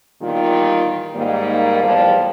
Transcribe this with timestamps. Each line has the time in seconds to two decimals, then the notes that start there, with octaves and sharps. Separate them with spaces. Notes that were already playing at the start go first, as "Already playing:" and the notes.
0.21 E2 A#2 D#3 G3 F4 G4
1.14 G#2 D#3 G3 A#3
1.83 E2 A2 F3 G3 G4